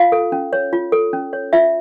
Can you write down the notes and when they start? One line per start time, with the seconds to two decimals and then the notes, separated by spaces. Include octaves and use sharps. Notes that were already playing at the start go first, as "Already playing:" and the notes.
Already playing: F4 F5
0.12 A4
0.32 C#4
0.53 C#5
0.73 F4
0.92 A4
1.13 C#4
1.33 C#5
1.53 F4 E5